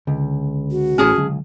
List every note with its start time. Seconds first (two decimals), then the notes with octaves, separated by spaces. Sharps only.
0.07 C#2 D3
0.71 F#4
0.98 A1 A2 E3 C#4 G#4 A5
1.17 C#2 D3 F#3 G#3